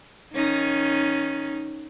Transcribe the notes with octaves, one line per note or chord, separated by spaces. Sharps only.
D#3 C#4 D#4